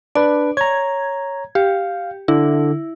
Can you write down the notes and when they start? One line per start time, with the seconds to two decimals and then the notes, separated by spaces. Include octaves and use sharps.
0.15 D4 B4 D5
0.57 C#5 A#5 G#6
1.55 G4 F5
2.28 D3 E4